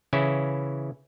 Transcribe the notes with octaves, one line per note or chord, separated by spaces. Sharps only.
C#3 E3 C#4 E4